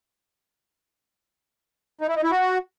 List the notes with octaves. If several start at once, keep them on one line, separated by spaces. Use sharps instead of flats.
D#4
E4
D#4
E4
F#4